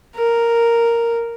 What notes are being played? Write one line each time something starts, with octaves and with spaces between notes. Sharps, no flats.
A#4